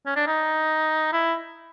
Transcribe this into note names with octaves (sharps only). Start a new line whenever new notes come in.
C#4
D4
D#4
E4